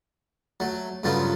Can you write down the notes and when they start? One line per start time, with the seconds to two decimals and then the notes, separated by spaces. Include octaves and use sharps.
0.60 F#3 A3
1.03 G2 C#3 F#3 A3 B3 F4